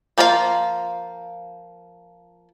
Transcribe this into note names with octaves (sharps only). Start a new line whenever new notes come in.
F3 A#3 F4 F#4 F5